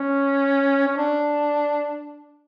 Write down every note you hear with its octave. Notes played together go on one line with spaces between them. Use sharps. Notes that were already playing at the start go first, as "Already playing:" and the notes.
Already playing: C#4
C#4
D4